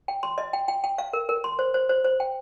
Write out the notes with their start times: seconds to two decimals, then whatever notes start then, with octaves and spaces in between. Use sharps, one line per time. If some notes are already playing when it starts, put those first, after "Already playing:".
0.08 G5
0.23 C6
0.38 D#5
0.53 G5
0.68 G5
0.84 G5
0.98 F5
1.13 A#4
1.29 A#4
1.44 C6
1.59 C5
1.74 C5
1.89 C5
2.04 C5
2.20 G5